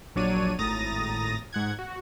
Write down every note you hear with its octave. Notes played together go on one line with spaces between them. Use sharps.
A#1 F#3 D4 C#5 D5 D#7
G#1 A2 A#5 D#6 A6 A#6
G#2 F#5 G#6
F#4